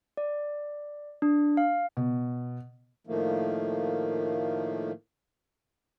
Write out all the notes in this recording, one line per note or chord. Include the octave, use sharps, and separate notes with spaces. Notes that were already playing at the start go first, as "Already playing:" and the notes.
D5
D4
F5
B2
A2 D#3 F3 A3 A#3